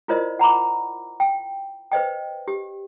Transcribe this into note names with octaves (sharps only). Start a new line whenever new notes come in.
E4 F4 A#4 C5 D5 D#5
F#5 A#5 B5 D6
G5
B4 C5 D#5 G5
G4